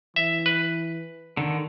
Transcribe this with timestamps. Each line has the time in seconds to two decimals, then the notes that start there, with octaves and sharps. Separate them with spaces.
0.16 E3 E5
0.46 B4
1.37 D3 D#3